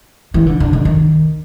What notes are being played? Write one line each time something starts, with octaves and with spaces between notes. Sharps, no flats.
E3
D3
D3
D#3
D#3